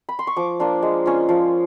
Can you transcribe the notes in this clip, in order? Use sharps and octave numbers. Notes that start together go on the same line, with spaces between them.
B5
C6
C#6
F3 D6
A#3 D4 F4
G#3
C#4 F4
F3